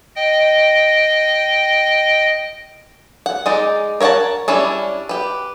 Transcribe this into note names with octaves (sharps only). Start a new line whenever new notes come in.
D#5 G5
F#5
G#3 D#4 D5
A#4 C#5 F5 F#5 A5
G3 C#4 D4 E4
G4 B4